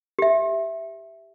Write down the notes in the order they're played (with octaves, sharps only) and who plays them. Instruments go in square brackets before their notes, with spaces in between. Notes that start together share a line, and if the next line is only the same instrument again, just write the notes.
[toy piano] G4 E5